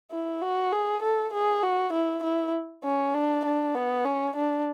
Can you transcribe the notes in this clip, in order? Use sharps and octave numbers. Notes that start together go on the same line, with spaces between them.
E4
F#4
G#4
A4
G#4
F#4
E4
E4
C#4
D4
D4
B3
C#4
D4